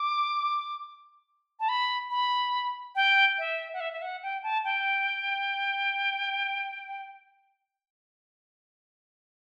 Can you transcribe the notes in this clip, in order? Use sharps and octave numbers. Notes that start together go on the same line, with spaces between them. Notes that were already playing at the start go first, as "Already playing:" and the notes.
Already playing: D6
A5
B5
B5
G5
E5
F#5
E5
E5
F#5
G5
A5
G5